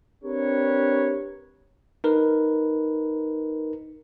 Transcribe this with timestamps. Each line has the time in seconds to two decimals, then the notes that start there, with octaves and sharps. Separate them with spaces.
0.24 C4 D4 G4 A#4 B4 C#5
2.04 D#4 A#4 B4